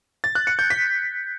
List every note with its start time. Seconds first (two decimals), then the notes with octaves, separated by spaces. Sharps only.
0.24 A6
0.35 F#6
0.47 C#7
0.59 G6
0.70 B6